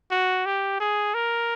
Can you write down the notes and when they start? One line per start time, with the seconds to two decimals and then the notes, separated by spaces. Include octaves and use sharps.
0.11 F#4
0.45 G4
0.80 G#4
1.14 A#4